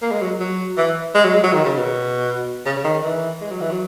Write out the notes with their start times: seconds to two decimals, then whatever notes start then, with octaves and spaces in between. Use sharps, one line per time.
0.02 A#3
0.12 G#3
0.22 F#3
0.40 F#3
0.78 E3
1.15 G#3
1.24 F#3
1.34 G#3
1.44 F#3
1.53 D#3
1.65 C#3
1.78 B2
2.66 C#3
2.77 C#3
2.85 D#3
3.03 E3
3.41 G#3
3.51 F#3
3.61 E3
3.71 F#3